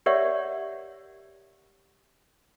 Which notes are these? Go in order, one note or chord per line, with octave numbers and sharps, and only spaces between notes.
G4 A#4 C#5 D5 E5 F#5